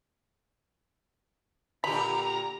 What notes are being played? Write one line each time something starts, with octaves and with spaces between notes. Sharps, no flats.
A#2 D3 G4 A#5 B5